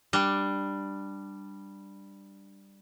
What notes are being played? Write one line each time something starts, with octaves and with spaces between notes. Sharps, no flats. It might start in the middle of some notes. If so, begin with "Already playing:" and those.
G3 D4